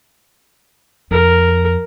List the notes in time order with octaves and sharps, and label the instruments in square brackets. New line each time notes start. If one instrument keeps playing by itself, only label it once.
[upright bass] F2 [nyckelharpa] A#4